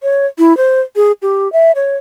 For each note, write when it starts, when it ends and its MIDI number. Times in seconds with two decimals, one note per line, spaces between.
0.03 0.26 73
0.38 0.56 64
0.57 0.81 72
0.96 1.12 68
1.22 1.51 67
1.53 1.72 76
1.75 1.97 73